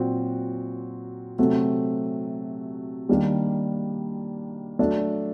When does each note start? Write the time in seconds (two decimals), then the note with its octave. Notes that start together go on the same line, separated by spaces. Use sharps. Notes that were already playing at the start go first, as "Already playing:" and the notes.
Already playing: A#2 F#3 C4 F#4
1.39 C3 F#3 A3 C4 F#4
3.09 D#3 G3 A#3 D4 G4
4.79 F#3 A3 D4